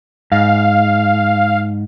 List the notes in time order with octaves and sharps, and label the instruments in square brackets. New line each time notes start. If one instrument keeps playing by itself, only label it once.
[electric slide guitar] G#2 [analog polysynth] F5